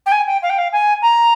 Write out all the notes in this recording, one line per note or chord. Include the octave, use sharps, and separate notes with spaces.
G5
G#5
G5
F5
G5
F5
G#5
A#5